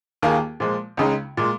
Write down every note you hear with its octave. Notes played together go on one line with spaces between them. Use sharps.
D#2 D#3 A#3 F4 G#4
A#2 F3 G#3
C#2 C#3 G#3 D#4
A#2 G#3